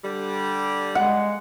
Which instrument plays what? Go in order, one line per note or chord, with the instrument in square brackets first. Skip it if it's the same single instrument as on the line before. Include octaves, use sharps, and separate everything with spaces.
[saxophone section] D3 G3
[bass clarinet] G#3 [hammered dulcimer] F#5